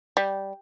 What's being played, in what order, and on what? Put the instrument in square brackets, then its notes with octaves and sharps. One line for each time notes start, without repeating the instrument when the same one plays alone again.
[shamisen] G3